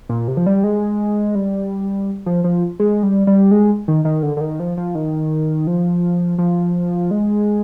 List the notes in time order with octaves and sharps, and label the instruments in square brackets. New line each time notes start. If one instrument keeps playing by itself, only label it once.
[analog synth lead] A#2
C3
F3
G3
G#3
G3
F3
F3
G#3
G3
G3
G#3
D#3
D#3
D3
D3
D#3
F3
F3
D#3
F3
F3
G#3